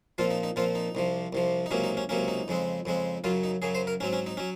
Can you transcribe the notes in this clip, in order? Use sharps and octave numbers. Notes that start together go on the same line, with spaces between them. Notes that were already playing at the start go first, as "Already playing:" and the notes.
A#2 F3 C4 F4
D#4
D#4
A#2 F3 C4 F4
D#4
C2 C3 F3
C2 C3 F3
D#4
C#2 C3 F#3 A#3 C#4
D#4
C#4
C#2 C3 F#3 A#3 C#4
D#4
F2 C#3 G#3 C4
F2 C#3 G#3 C4
F#2 C#3 F#3 F4
D#4
F#2 C#3 F#3 G#4
C5
A#4
G#2 F#3 C4 C#4
C#4
D#4
F#3 C#4